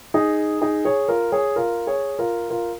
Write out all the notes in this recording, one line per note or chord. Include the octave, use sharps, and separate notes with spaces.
D#4 G#4
D#4 G#4
G#4 C#5
F4 A#4
G#4 C#5
F4 A#4
G#4 C#5
F4 A#4
F4 A#4